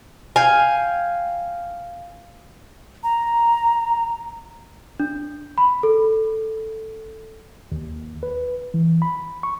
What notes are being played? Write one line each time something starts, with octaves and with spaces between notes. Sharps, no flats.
F5 G5 G#5
A#5
D4
B5
A4
D#2
B4
E3
B5
C#6